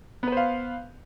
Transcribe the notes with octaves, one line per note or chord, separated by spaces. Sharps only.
B3 B4 C5 F5